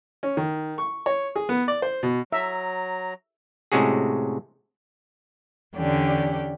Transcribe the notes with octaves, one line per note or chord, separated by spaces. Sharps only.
C#4
D#3
C#6
C#5
G#4
B3
D5
C5
B2
F#3 E5 A#5
A2 C3 G#3 C#4 F#4 G#4
E2 D3 C#4 G4 D5